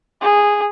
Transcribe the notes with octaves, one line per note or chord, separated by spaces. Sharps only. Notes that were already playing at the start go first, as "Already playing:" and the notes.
G#4